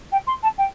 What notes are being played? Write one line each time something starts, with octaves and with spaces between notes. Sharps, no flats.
G5
C6
A5
G5